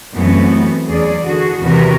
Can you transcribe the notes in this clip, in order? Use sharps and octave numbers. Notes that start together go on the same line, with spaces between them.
F#2 E3 G3 A3 B3 C4
E2 F#3 C#4 G#4 D5
D3 E3 F#4 G#4
E2 C3 D#3 F#4 A#4 B4